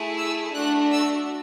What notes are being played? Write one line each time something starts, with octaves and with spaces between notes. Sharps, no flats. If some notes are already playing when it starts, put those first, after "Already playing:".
Already playing: A3 E4 G#4
E6
A3 D4 F#4 F#6
E6